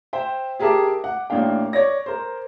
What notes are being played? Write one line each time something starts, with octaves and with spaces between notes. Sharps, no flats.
C5 E5 G5
G4 G#4 A#4 E5 A5 D6
F#5
A1 A#3 D4 F5 G5
C#5 D5 A#6
A#4 C5